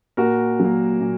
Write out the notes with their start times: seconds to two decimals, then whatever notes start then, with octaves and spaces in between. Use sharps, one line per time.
0.17 A#2 F#4 A#4
0.60 F#3 A#3
1.01 A#2